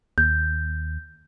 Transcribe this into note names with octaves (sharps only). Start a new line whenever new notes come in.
D#2 G6